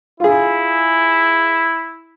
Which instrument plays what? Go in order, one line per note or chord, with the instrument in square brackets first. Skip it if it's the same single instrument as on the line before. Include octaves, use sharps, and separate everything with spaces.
[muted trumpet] E4 [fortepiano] F4 G#4